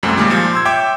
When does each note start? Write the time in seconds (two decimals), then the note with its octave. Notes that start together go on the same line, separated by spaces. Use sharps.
0.03 C2 F#2 G3 A3 C4
0.16 A#2 D#3 G3 G#3 A#3
0.30 A#2 F3
0.53 C6 E6 G#6
0.65 C#5 E5 G5 D6 G6 G#6